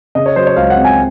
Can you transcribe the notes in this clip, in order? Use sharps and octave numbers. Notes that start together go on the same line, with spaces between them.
C#3 D#5
C#5
F#3 C5
C#5
C#2 F5
F#5
C4
G#5